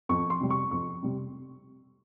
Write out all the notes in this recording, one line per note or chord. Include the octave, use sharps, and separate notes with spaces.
F2 C#6
C6
C3 G3
C#6
F2 C#6
C3 G3